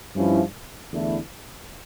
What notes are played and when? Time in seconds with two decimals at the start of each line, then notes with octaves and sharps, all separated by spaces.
0.16 G2 F3 C#4 E4
0.91 E2 D3 A3 E4